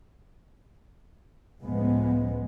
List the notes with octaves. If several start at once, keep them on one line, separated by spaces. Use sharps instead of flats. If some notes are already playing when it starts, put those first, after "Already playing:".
C#2 A2 F3 G#3 B3